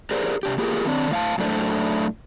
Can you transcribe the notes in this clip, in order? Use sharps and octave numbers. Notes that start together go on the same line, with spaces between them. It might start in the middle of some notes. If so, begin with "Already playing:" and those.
G4 G#4 A#4 C5 D5
C3 D4 G4
A#3 F4 G4 G#4 A#4
D#3 C4 D4
A2 F5 A5
F#2 A2 A3 D4 C5 D5